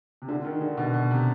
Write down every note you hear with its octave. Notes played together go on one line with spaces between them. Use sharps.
C3
D3
D#3
D3
B2
B2
C3